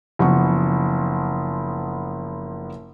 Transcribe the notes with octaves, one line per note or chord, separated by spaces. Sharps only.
F#1 F3 B3 C#6